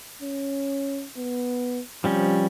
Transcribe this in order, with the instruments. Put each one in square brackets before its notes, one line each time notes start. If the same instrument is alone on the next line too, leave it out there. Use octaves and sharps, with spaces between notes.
[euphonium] C#4
B3
[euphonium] C3 [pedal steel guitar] F3 G3 C#4